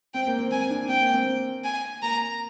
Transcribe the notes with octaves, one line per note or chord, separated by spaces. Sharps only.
C4 G5
A#3
C4
C4 G#5
D4
C4 G5
A#3
C4
A#3
G#5
A#3 A#5